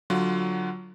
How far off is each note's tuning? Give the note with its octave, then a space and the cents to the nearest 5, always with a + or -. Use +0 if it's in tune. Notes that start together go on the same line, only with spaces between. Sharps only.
D3 +0 F#3 +0 F4 +0